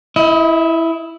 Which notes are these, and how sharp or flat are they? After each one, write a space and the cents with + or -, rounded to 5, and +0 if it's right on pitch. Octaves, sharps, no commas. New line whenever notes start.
E4 +0 D#5 +35